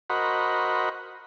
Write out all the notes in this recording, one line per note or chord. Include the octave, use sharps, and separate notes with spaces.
F#4 A#4 C5 D#5 F#5 B5